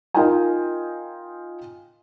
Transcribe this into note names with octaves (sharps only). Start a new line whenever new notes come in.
D#4 F4 A#4 D#5 G5 G#5